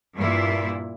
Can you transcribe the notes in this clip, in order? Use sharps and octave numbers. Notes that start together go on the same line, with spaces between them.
G2 A#2 E4